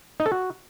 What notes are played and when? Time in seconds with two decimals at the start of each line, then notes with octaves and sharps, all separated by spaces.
0.20 D#4
0.26 A4
0.32 F#4